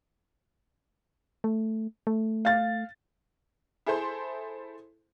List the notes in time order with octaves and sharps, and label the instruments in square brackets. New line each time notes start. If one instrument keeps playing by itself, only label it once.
[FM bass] A3
A3
[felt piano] F5 A6
[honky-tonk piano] E4 G#4 A4 C5 C6